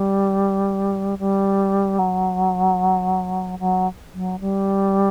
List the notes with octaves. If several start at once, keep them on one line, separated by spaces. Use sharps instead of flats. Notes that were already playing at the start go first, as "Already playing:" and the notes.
Already playing: G3
G3
F#3
F#3
F#3
G3